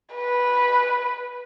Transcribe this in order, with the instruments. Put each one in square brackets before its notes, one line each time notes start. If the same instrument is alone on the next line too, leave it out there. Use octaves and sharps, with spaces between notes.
[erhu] B4